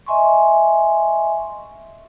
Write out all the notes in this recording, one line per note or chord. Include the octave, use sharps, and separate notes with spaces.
D#5 E5 G#5 C6 C#6